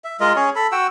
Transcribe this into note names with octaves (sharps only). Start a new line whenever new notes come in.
E5
G#3 F4 A#4 D#5
C#4 G#4 C#5
A4 B5
F#4 F#5 G5 E6